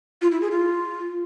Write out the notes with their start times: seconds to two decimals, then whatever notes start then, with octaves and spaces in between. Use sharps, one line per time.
0.22 F4
0.32 E4
0.41 G#4
0.51 F4